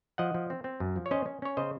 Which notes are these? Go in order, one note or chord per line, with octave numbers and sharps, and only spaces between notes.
F3 D#5 F#5
F3
C4
C4
F#2
F3
C#5
C#4 C5 D#5
C#4
C#4 C#5
C#3 C5 D#5